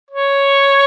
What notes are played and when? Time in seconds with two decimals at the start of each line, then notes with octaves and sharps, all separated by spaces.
0.11 C#5